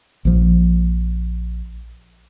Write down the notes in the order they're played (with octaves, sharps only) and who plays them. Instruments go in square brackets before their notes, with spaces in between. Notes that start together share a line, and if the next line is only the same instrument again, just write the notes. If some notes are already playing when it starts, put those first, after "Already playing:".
[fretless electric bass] A#1 F3